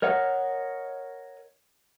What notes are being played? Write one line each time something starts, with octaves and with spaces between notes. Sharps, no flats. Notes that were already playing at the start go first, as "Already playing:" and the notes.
A#4 C#5 D#5 F#5